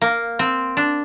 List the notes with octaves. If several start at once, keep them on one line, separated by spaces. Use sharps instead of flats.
A#3
C4
D4